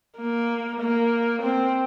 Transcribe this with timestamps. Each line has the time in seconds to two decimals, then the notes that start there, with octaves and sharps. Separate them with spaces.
0.18 A#3
0.80 A#3
1.42 C4